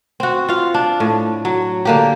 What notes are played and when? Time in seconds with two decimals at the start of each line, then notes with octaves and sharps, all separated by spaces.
0.20 C4 F#4
0.48 F4 F5
0.74 D4
1.00 A2
1.45 F#3
1.85 D3 A#3 G4